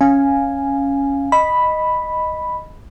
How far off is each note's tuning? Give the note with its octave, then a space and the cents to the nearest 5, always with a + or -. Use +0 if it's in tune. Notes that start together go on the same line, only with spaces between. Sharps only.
C#4 +0 F5 +0 G#5 +0
D#5 +0 B5 +0